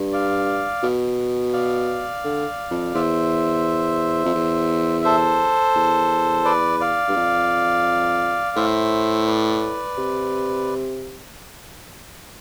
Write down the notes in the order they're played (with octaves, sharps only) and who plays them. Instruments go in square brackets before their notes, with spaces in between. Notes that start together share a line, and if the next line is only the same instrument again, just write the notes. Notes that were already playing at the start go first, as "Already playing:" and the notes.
Already playing: [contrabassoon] G2
[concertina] D5 F5
[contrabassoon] B2
[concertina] D5 F5
[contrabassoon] D3
F2
[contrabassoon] E2 [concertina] C5 E5
[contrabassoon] F2
E2
[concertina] A4 C5
[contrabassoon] E2
[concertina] B4 D5
D5 F5
[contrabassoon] G2
F2
[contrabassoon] A2 [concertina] C5 E5
[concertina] B4 D5
[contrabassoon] C3